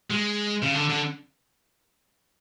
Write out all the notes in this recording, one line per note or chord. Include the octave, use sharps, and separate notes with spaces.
G#3
C#3
D3
D3